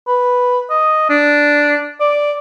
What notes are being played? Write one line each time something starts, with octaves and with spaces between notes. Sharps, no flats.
B4
D#5
D4
D5